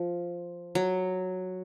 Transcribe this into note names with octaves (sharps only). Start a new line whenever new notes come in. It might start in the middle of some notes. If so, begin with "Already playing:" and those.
Already playing: F3
F#3